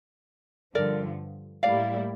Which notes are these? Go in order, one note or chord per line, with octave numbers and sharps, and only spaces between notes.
G2 D3 F3 A#4 D5
A2 G3 A#3 E4 D5 F5